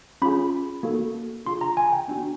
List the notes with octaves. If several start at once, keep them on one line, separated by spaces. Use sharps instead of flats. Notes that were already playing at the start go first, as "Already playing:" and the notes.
C#4 F4 G#4 B5
A#3 D#4 F#4 A4
D4 F4 G#4 C6
A#5
G#5
G5
B3 D4 F#4